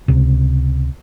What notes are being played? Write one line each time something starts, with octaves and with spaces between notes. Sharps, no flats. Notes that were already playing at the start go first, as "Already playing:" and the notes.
C#2 C3